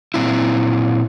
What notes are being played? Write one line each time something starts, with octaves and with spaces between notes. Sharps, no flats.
A#2 C4 E4